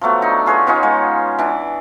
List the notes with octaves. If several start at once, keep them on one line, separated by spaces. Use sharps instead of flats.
F3 F#3 A3 B3
D4 D#4
F4 G#4 B4 C#5
B3 C#4 D#4 F4
G#3 F4
E3 D4